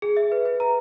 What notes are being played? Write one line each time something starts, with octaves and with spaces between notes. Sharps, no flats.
G#4
E5
B4
B4
A#5